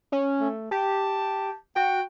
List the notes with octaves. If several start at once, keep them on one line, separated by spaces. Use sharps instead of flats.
C#4
A3
G4 A5
F#4 G5